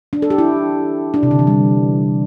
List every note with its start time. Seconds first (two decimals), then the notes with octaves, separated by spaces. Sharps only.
0.13 D4
0.22 A4
0.30 G4
0.38 E4
1.14 D4
1.23 C3
1.31 D3
1.39 E3
1.47 G3